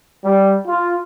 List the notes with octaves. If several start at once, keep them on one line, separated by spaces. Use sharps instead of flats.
G3
F4